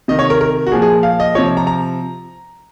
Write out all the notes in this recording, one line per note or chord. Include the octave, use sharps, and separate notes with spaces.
C3 D#3 D#5
C#5
A#4
A#4
F#4
A#2 F3 G#4
G#4
F5
D#5
C3 F3 C#5
A#5
A#5